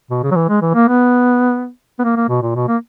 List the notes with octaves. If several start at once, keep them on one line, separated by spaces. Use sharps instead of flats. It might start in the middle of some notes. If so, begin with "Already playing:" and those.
B2
C#3
F#3
E3
G#3
E3
A#3
B3
B3
A#3
A#3
B2
A#2
B2
A#3